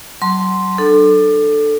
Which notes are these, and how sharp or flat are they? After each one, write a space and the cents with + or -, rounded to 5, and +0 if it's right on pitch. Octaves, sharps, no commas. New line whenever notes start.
F#3 +30 A5 +0 C6 +0
D4 +30 A4 +0